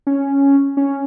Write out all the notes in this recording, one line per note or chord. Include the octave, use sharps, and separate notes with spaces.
C#4
C#4